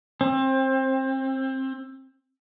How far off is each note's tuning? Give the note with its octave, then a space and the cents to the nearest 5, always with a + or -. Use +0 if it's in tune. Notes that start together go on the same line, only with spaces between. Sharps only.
C4 +25